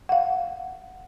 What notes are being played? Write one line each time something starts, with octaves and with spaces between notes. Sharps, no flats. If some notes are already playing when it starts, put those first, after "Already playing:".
F5 F#5